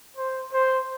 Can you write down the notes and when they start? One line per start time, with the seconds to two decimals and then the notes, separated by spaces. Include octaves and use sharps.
0.17 C5
0.53 C5